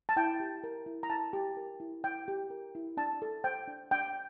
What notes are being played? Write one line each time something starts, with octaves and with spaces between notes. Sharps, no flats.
A5
E4 G5
G4
A#4
E4
A#5
E4 A5
G4
A#4
E4
E4 G5
G4
A#4
E4
D4 A5
A4
C5 G5
D4
D4 G5